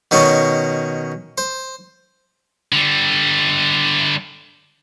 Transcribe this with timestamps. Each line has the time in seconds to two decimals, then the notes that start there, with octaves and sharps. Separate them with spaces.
0.11 B2 D#3 C#4 C#5
1.38 C5
2.72 D3 G3